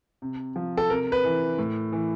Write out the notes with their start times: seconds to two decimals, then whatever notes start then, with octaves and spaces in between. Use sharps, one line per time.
0.22 C3
0.56 F3
0.77 A4
0.90 C3 A#4
1.12 B4
1.25 E3
1.58 A2
1.93 E3